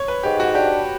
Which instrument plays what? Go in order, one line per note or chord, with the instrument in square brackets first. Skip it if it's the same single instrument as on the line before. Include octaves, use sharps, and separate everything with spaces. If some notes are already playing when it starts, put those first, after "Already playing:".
Already playing: [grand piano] C#5
B4
[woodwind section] G#2 [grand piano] G4
[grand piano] F#4
[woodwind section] D4 [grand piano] G4